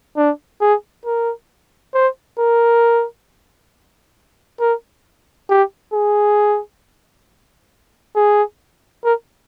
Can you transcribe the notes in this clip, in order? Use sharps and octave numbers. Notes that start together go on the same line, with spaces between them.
D4
G#4
A#4
C5
A#4
A#4
G4
G#4
G#4
A#4